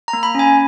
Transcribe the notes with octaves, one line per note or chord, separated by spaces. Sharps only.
A#5
A#3
B5
C#4 G#5